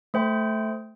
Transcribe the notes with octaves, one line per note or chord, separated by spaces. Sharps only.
A3 C5 G5